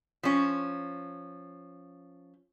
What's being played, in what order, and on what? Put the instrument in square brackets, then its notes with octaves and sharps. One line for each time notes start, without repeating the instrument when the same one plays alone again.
[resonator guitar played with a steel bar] F3 C#4